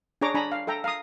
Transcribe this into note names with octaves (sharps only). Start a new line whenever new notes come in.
D4 G#4 C#5 A#5 D6
D4 G#5 A#5 B5
F5
A4 E5 G5 A#5
F5 A#5 D#6